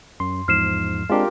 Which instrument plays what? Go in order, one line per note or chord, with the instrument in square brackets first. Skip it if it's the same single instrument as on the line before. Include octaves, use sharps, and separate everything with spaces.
[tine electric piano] F#2 [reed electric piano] C6
[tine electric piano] E2 G#2 F3 [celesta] F6 C7 E7
[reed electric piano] G#3 C4 D4 [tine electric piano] F4 G4 A#4